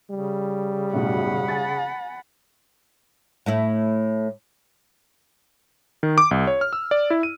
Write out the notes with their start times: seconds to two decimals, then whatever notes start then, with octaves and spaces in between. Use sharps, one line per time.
0.10 C#3 G3
0.93 B1 F#2 A2 F#5 B5
1.48 G#5 A6
3.46 A2 A3 E4
6.03 D#3
6.18 D6
6.31 C2
6.47 C#5
6.61 F6
6.73 E6
6.91 D5
7.10 E4
7.23 D#7